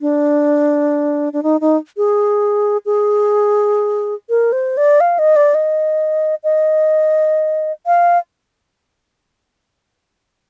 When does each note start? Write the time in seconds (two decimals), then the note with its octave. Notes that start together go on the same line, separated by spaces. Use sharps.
0.01 D4
1.33 D4
1.43 D#4
1.61 D#4
1.97 G#4
2.86 G#4
4.29 A#4
4.52 C5
4.77 D5
5.00 F5
5.19 D#5
5.36 D5
5.54 D#5
6.43 D#5
7.86 F5